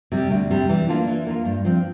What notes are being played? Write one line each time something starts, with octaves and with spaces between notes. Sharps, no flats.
C3 G3
D2
C3 G3
E3
A#3 D4 F4
E3
A#3 D4 F4
G2
F3 C4